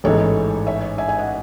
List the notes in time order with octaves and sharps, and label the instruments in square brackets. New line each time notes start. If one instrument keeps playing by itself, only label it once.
[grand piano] A1 G#2 E3 [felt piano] A4 C#5
[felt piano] C#5 E5
E5 G#5
E5 G#5
D#5 F#5